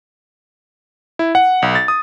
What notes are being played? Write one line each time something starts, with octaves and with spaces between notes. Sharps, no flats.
E4
F#5
B1
A6
D#6